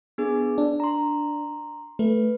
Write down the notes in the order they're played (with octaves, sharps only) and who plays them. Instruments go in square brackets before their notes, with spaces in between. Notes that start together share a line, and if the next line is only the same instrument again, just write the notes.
[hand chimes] B3 D4 G#4
[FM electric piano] D4
[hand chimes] A#5 C6
[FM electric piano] A3 [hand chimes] B4